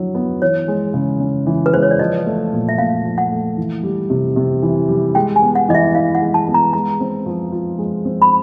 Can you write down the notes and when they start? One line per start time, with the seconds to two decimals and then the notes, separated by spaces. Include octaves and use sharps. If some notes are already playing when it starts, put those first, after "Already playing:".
Already playing: D3 F#3 E4
0.15 B3
0.42 E3 C#5
0.68 G#3
0.94 C#3
1.20 C#4
1.46 E3
1.66 B4
1.73 G#3 C5
1.82 C#5
1.91 D5
1.99 F3 D#5
2.26 A3
2.53 A#2
2.69 E5
2.78 A#2 F5
3.05 F3
3.18 F#5
3.32 A3
3.57 E3
3.83 G3
4.10 C3
4.36 C3
4.62 E3
4.89 G3
5.15 G#3 G5
5.36 G#5
5.42 B3
5.55 F#5
5.69 E3 D#5
5.75 E5
5.95 E4 F5
6.15 F#5
6.21 G#3
6.34 A5
6.48 B3
6.54 A#5
6.73 G#3 A#5
7.00 C4
7.26 F3
7.52 F4
7.79 G#3
8.05 C4
8.22 B5